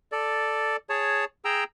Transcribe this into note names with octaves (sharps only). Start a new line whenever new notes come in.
A4 D5
G#4 C#5 A5
G#4 G5 A#5 E6